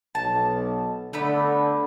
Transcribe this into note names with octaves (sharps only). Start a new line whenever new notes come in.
B1 A5
D3 A3 B3 B5